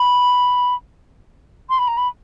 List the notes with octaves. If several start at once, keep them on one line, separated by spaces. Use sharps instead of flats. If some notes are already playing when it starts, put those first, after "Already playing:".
Already playing: B5
C6
B5
A#5
B5